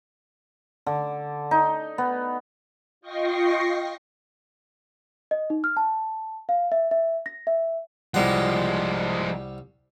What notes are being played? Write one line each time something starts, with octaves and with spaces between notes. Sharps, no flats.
D3
D#4
B3
F4 D#5 G5 C#6 A#6 C7
D#5
D#4
F6
A5
F5
E5
E5
A#6
E5
C2 F3 G3 G#3 F#5